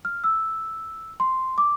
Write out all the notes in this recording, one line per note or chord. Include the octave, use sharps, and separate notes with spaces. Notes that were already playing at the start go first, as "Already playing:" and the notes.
F6
E6
C6
D6